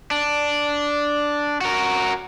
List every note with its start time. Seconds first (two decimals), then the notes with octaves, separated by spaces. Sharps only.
0.11 D4
1.61 F#4 A#4